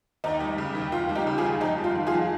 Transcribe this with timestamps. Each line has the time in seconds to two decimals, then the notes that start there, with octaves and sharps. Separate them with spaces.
0.24 D#2 D#4
0.40 G3
0.58 C#3
0.75 D#2
0.92 D#2 F4
1.09 G3
1.15 D#4 G4
1.27 C#3
1.38 F4 G#4
1.44 D#2
1.60 F2 D#4 G4
1.78 G3
1.84 F4
1.95 D#3
2.07 F4 G#4
2.12 F2